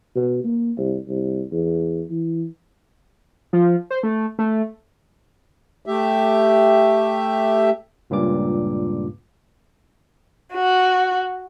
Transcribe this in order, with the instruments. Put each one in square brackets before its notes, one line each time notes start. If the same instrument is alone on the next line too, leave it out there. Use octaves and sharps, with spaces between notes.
[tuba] B2
A#3
C2
C2
E2
E3
[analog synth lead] F3
C5
A3
A3
[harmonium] A3 G4 E5
[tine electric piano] C#2 G2 A#2 D6
[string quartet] F#4